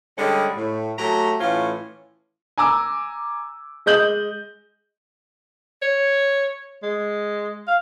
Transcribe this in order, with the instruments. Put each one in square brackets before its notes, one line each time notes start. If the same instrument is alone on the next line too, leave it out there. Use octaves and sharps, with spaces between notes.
[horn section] D3 G3 G#3 C#4
A2
F#3 A3 G4 A#5
A2 E3 C#4 F4
[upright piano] G#5 A#5 D6 E6
G#3 D#5 G6 F#7
[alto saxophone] C#5
G#3
F5